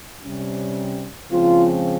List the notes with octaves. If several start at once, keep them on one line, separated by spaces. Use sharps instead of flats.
C3 G3 C#4
C#3 F3 G#3 C4 F4